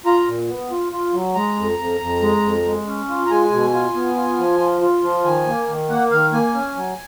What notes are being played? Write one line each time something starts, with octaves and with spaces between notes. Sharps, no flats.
F4 A#5
A#2
B3
F4
F4
F#3
G#3 A#5
F2
F2
F2
G#3
F2
G#3
C#4
F4
A#5
G#3 G#5
B2
F4
B3
F4
F3
F4
F4
F3
D#3 G#5
A#3
D#3
A#3 F#5
D#3 F5
A#3 G#5
C#4
F#3